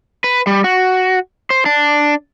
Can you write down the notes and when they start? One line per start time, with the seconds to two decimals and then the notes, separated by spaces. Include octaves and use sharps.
0.24 B4
0.47 G3
0.64 F#4
1.50 C5
1.66 D4